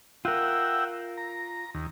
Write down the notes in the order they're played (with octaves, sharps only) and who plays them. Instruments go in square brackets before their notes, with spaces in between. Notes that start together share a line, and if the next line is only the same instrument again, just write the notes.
[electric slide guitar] F4 A#4 [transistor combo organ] E5 F#5 G5
[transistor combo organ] A#5
D#2